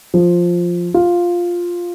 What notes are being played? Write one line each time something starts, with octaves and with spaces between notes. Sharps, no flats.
F3
F4